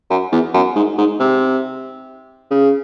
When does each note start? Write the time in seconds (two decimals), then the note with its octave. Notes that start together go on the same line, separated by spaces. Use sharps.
0.10 F#2
0.32 E2
0.54 F#2
0.76 G#2
0.98 G#2
1.20 C3
2.51 C#3